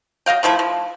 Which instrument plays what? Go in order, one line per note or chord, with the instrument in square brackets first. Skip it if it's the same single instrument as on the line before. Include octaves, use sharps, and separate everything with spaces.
[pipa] F#3 D#5 F5 G5
D#3 F3 A3 E4
F3